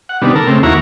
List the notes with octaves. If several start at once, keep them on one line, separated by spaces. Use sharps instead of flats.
F#5
C3 D#3 G3 B3 D4
A4 A#4
C#3 A3 C4
D#2 A#3 E4 F#4 A#5 C#6